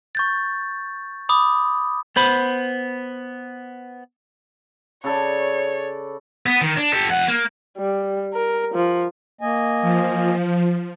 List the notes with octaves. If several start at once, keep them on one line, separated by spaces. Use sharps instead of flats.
C#6 G6 A6
B5 D6 D#6
B3 C5 B5
C#3 A4 C#5 D5
B3
D#3
D4
G4 A4
F2 F#5
A#3
G3
A#4
F3
A#3 D#5 G#5
F3